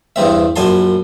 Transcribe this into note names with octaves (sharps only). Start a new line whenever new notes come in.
E2 G2 C4 E5
A#1 F#2 G#5 A5 C6